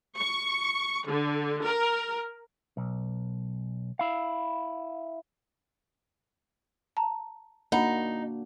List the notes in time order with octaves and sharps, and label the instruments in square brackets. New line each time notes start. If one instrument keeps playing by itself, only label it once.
[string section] C#6
D3
A#4
[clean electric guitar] B1
E4 F5
[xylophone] A5 A#5
[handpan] A#3 D4 F#4 [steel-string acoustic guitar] D#4 [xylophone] F#5 A#5 B5